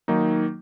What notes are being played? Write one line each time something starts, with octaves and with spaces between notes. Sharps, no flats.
D#3 F#3 A#3 D#4